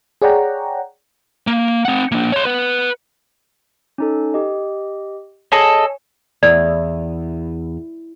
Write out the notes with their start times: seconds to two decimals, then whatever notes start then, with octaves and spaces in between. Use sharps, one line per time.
0.22 G#4 C#5 D5 F#5 G5 A#5
1.47 A#3
1.85 C4 F#5
2.12 A#3 D4
2.32 C#5 C6
2.45 B4 F#5
3.98 C#4 D#4 A4
4.34 G4 D#5
5.52 G#4 A4 C#5 D#5 G#5
6.43 E2 D5